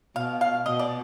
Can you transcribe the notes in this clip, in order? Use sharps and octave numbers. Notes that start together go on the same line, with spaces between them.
B2 F5
F5
B2 D#5
D5